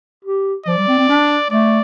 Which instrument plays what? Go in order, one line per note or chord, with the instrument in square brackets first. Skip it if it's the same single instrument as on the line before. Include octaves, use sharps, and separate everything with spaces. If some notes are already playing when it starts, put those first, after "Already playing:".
[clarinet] G4
[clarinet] F3 [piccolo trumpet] D5
[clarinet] G3
C4
C4
D4
[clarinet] A3 [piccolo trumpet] D5